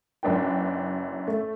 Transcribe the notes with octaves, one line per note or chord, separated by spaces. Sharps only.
F#1 F#2 D4 B4 G5
A3